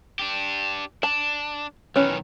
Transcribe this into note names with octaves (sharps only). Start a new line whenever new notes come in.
D4 G4
D4 A5
B1 D#3 E3 C#4